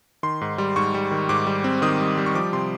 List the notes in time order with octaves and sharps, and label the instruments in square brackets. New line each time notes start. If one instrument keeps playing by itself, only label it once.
[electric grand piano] D#3 C6
G#2
G3
G#2 C#6
G3
D#3
G#2 D6
G3
C4
D#3 D#6
G3
G3
C#6
F3 D6
C3 C6